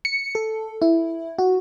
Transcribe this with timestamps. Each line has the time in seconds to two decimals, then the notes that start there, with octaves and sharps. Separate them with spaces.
0.05 C#7
0.35 A4
0.82 E4
1.39 F#4